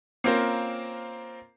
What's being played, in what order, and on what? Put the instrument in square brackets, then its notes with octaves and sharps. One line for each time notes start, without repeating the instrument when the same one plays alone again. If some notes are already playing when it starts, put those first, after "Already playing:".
[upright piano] A#3 C4 C#4 F4 A#4 C5